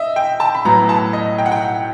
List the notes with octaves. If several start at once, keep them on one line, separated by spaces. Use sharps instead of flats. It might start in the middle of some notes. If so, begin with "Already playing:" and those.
Already playing: D#5 E5
G5
A5
B5
A2 F#3 B3 A#5
A5
D#5
G5
F#5
G5